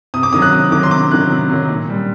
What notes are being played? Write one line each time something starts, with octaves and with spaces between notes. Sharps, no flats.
C3 D#6
D6
D#3 F#3 D#6
F#6
C3 D#6
D#3 F#3 D6
C6
C3 D6
D#3 F#3 F#6
C3
D#3 F#3
A#2
G3